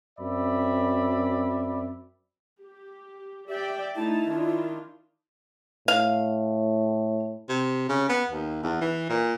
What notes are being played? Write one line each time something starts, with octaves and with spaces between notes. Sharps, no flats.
F#2 C4 D5 E5 B5
G4
G4 D5 E5 G5
A3 D#4 E4 A5
D#3 D4 F4
A2 F5
C3
C#3
B3
D#2
E2
E3
A#2